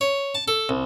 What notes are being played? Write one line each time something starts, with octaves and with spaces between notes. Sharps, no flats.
C#5
A5
A4
C2